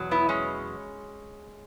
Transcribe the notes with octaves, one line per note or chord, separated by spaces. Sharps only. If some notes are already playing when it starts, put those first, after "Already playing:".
Already playing: E2 B2 F#3
B3 E4
G#3 C#4